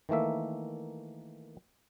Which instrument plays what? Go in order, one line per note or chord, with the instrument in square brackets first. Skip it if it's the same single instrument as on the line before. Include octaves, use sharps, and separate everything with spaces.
[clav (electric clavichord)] D#3 E3 A3 A#3 E5